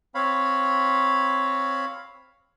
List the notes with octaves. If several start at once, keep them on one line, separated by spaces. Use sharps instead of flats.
C4 C#5 F5 B5